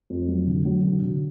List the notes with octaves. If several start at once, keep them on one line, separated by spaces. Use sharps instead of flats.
F2
F#3
D3
F#3
D3
D3